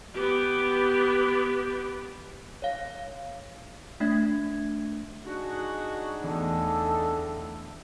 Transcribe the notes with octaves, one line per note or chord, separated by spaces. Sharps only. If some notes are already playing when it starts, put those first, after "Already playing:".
B3 G4
C#5 F5
A3 D4 E5 G#6
D4 D#4 F#4 G#4
E2 A2 D3 A3 A4